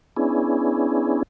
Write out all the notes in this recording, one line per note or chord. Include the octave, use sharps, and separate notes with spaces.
B3 C#4 D4 E4 G#4